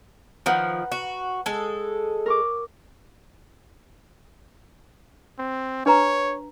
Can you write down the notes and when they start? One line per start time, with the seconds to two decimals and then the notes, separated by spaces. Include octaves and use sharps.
0.46 D#3 F3 B4 F#5 A#5
0.92 F#4
1.46 G#3 A4
2.26 A#4 C#6 D6
5.39 C4
5.86 D4 B4 C#5 A#5